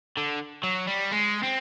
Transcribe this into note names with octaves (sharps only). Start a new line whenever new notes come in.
D3
F#3
G3
G#3
C4